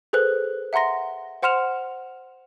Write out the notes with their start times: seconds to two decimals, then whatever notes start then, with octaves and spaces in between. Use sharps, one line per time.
0.13 G#4 A4 B4 C5 F#6
0.73 E5 F#5 A#5 C6 A#6
1.43 C5 F#5 C6 F6 E7 F7